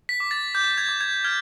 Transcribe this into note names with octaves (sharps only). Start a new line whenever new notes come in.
B6
D6
A6
D6 G6
G#6
D6
G#6
F6 G#6